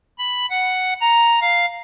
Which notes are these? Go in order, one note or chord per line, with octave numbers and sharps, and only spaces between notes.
B5
F#5
A#5
F5